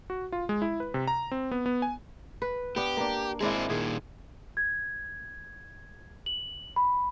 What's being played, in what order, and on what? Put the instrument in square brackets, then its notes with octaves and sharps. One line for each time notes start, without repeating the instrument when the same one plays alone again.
[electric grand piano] F#4
F4
G#3
E4
B4
C3
A#5
C4
B3
B3
G#5
[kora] B4
[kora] B3 D4 [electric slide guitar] G4
[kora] A#3 D4
[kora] G#3 D4 E4 [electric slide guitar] C4 G#4
[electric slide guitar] A#2 D#3 [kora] G#4
[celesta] G#6
F#7
B5